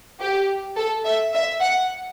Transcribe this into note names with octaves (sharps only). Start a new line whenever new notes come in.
G4
A4
E5
E5
F#5